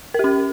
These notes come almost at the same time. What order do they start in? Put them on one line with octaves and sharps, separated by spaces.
A#4 G4 C#4